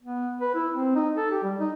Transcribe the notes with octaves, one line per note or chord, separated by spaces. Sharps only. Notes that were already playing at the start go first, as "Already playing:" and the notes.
B3
B4
E4
C4
D#4
A4
G4
G3
D#4